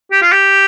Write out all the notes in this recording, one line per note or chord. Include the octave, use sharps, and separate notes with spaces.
G4
F4
G4